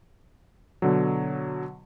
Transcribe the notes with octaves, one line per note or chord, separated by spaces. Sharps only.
B2 D3 F#3